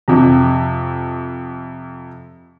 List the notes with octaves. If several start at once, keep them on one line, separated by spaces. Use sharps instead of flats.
F2 C3